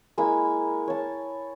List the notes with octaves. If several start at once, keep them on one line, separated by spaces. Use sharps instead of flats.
G#3 A#3 E4 B5
C#5 A5